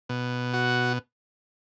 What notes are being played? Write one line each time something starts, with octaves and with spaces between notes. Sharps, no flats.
B2
F#4